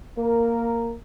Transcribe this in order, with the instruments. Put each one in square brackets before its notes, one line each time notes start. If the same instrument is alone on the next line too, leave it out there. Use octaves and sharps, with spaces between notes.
[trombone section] A#3 A#4